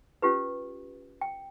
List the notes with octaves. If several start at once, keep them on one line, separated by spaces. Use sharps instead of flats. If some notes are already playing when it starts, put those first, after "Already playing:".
C#4 F4 G4 B4
G5